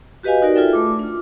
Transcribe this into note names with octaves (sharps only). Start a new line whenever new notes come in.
F#4 G4 B4 D#5 F5 G#5
D#4 F#4 A#4 D5
F4 G#4 A4 E5 G5
A3 D6
D4 F4